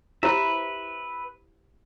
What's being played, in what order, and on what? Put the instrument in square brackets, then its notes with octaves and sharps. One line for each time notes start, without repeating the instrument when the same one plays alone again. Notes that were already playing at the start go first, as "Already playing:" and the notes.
[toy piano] E4 G4 C5 [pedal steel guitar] B4 E5